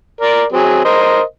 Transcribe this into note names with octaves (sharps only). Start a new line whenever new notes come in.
A#4 D5
F#3 C4 G#4
A#4 C5 D#5